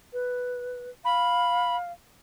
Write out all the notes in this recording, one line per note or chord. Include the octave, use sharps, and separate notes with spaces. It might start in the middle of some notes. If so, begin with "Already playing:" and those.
B4
F5 B5